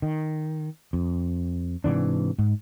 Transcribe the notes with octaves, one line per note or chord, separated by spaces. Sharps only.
D#3
F2
G#2 C3 E3 D4
G#2